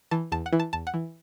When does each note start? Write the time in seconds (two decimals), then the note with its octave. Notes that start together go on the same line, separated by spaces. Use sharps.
0.11 E3 A5
0.32 E2 A5
0.46 F#5
0.53 E3
0.60 A5
0.73 E2 A5
0.87 F#5
0.94 E3